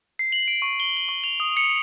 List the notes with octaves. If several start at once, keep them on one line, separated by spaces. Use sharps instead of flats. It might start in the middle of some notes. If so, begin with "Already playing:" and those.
C7
F#7
D7
C#6
G7
F#7
C#6
F7
D#6
C#7